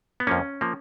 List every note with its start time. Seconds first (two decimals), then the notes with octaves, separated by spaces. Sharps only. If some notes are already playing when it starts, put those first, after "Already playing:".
0.20 B3
0.27 F2 F3 A#3 C#4
0.61 F3 A#3